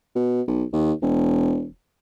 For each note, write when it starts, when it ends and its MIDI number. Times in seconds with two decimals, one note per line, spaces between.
0.16 0.41 47
0.47 0.63 35
0.73 0.92 39
1.02 1.66 28